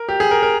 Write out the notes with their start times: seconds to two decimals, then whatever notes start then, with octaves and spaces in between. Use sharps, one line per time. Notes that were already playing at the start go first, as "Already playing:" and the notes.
Already playing: A#4
0.09 G4
0.20 G#4
0.31 A#4
0.43 A#4